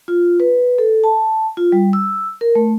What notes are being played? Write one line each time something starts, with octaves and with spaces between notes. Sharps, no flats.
F4
B4
A4
A5
F4
G3
E6
A#4
A3